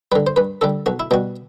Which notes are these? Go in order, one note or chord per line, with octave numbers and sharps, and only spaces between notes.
D3 G3 B4
C5
G2 B4
D3 G3 A4
B1 F#4
E4
B2 G3 F#4